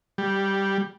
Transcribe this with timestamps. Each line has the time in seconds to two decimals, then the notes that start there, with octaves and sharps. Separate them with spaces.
0.18 G3